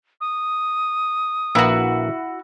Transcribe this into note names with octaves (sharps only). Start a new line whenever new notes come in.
D#6
A#1 A#3 E4 F#4 B4